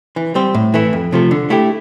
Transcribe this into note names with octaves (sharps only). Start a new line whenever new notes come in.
E3
G3 C4
A2
E3 A3 E4
F2
C3 F3 A3
D3
A3 E4 G4